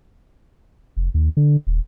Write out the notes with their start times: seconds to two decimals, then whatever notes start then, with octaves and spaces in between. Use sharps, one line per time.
0.97 F1
1.14 D#2
1.37 D3
1.67 D#1